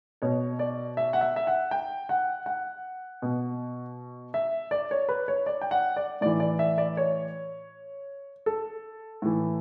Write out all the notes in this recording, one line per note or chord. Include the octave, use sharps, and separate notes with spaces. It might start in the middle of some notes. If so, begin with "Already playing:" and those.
B2 C#5
D5
E5
F#5
E5
E5
F#5
G5
F#5
F#5
B2
E5
D5
C#5
B4
C#5
D5
G5
F#5
D5
A2 E3 D5
D5
E5
D5
C#5
A4
A2 E3